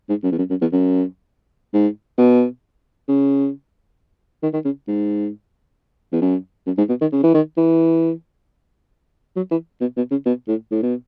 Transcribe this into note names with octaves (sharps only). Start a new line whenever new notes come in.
G#2
F#2
E2
F#2
F#2
E2
F#2
G#2
B2
C#3
D#3
D#3
C#3
G#2
E2
F#2
F#2
G#2
B2
D#3
C#3
E3
D#3
E3
F#3
E3
B2
B2
C#3
B2
A2
A2
B2